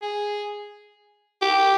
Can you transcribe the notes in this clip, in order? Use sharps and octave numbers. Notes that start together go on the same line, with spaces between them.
G#4
G4